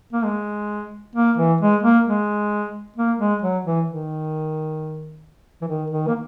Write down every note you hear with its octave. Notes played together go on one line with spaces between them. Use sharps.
A#3
G#3
A#3
E3
G#3
A#3
G#3
A#3
G#3
F#3
E3
D#3
E3
D#3
D#3
A#3